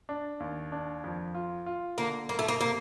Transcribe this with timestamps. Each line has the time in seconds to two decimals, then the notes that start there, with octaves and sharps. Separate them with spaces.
0.09 D4
0.40 D#2
0.72 D4
1.04 F2
1.35 F4
1.66 F4
1.97 D3 A#3
2.28 G1 A#3
2.39 A3
2.49 A#3
2.60 C3 A#3